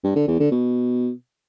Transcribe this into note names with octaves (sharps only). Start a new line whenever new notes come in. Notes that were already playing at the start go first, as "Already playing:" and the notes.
G2
D3
E2
D3
B2